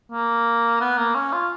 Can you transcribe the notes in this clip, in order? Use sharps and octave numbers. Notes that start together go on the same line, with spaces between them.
A#3
B3
A#3
C#4
F4